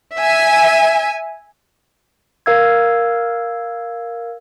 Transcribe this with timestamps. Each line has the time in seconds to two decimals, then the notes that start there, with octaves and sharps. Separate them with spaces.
0.17 E5 G#5
2.46 A#4 F5 E6 G#6